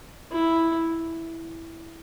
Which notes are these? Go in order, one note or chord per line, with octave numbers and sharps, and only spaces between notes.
E4